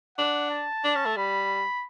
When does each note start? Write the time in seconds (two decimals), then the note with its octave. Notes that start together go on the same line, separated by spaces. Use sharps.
0.18 D4 F#5
0.51 A5
0.84 D4
0.95 C#4
1.06 A3
1.16 G3 B5